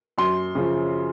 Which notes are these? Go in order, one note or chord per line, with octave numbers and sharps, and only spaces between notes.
F#2 C6
C#3 F3